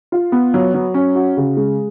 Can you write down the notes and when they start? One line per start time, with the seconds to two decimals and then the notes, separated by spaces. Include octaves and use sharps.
0.12 F4
0.32 B3
0.54 F#3
0.74 F#3
0.94 C#4
1.15 F#4
1.37 C#3
1.57 G#3